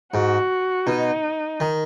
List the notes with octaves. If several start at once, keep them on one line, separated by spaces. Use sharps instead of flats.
G#2 F#4
B2 D#4
D#3